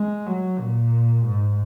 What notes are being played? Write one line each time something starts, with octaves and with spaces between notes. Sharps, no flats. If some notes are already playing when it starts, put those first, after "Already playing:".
Already playing: G#3
F#3
A#2
G#2